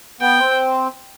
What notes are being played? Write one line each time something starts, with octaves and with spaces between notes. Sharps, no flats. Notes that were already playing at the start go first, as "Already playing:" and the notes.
B3 G5
C4